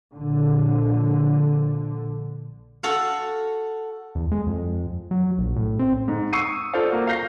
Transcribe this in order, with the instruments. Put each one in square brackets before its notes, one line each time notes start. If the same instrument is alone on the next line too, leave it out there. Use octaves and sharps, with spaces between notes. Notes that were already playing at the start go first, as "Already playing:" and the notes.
[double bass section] A#1 D3
[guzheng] F#4 A4 F5 F#5
[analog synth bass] E2
G#3
F2
F#3
A#1
A2
C4
[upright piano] G#2
C#6 D#6 E6 C7 C#7 D#7
F4 A4 C5 D5 F5
A#3 F#4
F5 F6 G6 A#6 C7